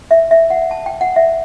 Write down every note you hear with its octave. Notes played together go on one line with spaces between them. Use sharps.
E5
E5
F#5
A5
G5
F#5
E5